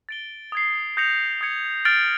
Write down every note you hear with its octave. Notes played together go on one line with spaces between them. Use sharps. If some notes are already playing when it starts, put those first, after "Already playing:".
A6 D7 G7
D#6 G#6 C7
D#6 G6 A#6 C#7 F7
D#6 G#6 C#7
F6 A6 D7 F#7